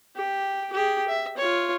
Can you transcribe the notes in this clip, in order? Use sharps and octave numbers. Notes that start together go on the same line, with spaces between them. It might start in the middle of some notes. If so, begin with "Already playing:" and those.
G4
G4 G#4
E5
F4 C#5